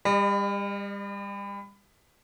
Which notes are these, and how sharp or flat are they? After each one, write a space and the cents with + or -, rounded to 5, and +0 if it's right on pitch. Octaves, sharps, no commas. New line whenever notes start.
G3 +35 D#5 -35